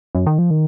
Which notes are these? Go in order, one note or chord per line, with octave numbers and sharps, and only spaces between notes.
F#2
D#3
F3
D#3